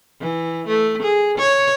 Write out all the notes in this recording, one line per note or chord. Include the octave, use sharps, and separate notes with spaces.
E3
A3
G#4
C#5